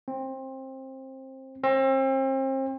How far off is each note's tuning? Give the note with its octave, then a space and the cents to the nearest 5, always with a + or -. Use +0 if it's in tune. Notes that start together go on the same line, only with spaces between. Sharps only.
C4 +20
C4 +35